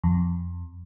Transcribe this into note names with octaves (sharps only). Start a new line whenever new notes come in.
F2